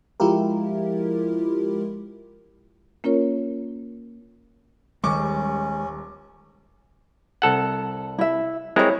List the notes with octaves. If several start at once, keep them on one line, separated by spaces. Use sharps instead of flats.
F3 G#3 E4 F4 G4 A#4
A#3 C#4 F4 A#4 C#5
D#1 D#3 G3 G#3 C#4 C#6 D6
C2 A4 F#5
E4 E5
G#3 C4 E4 A#4 C#5